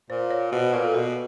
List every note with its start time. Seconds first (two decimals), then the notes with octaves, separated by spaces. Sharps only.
0.10 A#2 C5
0.31 C#5
0.52 B2 C5
0.73 A#2 B4
0.84 A4
0.94 B2 A#4